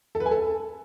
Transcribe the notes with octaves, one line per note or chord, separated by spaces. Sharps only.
A4
B4
G#5
A4